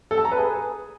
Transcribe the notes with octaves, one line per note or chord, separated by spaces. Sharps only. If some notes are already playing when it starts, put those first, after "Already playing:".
A4
A5
A#5
B4
G#4